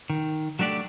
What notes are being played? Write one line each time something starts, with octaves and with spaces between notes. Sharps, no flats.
D#3
F#3 A3 D4 G4 D5